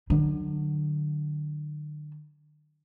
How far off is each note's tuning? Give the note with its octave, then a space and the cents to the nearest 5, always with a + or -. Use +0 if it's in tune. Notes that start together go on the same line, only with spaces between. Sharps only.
D3 +35 F#3 +0